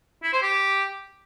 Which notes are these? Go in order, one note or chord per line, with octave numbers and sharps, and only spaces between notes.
E4
C5
G4